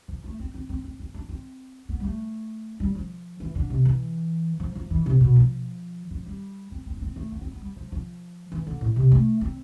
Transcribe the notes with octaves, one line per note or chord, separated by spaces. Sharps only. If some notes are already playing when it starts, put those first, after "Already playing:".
F3
A3
C4
C4
C4
C4
C4
D4
C4
B3
G3
A3
G3
F3
E3
D3
C3
E3
F3
F3
E3
C3
B2
F3
F3
G3
C4
C4
D4
C4
A3
B3
C4
B3
G3
F3
F3
E3
D3
A2
C3
A3
C4